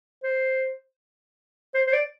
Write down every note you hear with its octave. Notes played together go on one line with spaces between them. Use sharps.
C5
C5
C5
D5